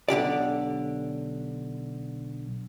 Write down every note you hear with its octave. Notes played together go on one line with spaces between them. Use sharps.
B1 D3 G4 D5